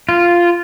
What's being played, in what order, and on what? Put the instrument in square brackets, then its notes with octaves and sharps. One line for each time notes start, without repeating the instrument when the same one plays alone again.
[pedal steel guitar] F4